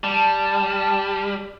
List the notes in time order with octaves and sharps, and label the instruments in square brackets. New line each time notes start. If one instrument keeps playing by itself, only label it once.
[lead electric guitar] G3 [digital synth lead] A5